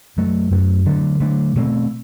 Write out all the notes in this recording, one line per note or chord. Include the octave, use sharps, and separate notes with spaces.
F#2 F#3 A3
F#2 F#3 A3
D3 F#3 A3 D4
D3 F#3 A3 D4
B2 A3 C4